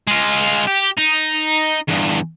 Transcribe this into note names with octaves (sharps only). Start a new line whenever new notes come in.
G#3 F4
G4
D#4
E2 G2